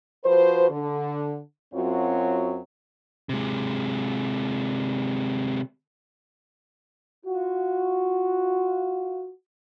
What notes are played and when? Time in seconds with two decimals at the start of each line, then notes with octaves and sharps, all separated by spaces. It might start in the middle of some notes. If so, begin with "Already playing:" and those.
0.24 F3 F#4 B4 C5
0.69 D3
1.74 F#2 F#3 C4 F4 F#4 C#5
3.29 C3 G#3
7.26 F4 F#4